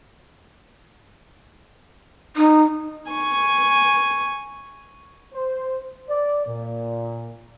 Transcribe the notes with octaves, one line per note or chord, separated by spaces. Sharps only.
D#4
G#5 C#6
C5
D5
A#2